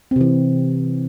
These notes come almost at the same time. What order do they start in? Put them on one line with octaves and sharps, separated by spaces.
C4 C3 E3